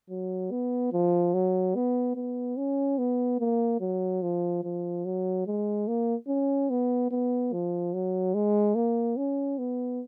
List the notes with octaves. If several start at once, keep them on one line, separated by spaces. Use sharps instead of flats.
F#3
B3
F3
F#3
B3
B3
C#4
B3
A#3
F#3
F3
F3
F#3
G#3
A#3
C#4
B3
B3
F3
F#3
G#3
A#3
C#4
B3